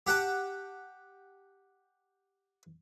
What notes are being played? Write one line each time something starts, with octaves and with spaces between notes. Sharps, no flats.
G4 F#5 G5 A5